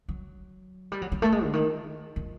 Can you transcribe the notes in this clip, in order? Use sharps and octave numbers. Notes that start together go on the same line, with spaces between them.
F#3
G3
F#3
F#3
A3
G#3
D3
D#3
F3